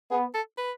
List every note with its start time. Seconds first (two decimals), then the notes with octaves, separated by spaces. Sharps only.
0.11 B3 G#4
0.34 A4
0.58 B4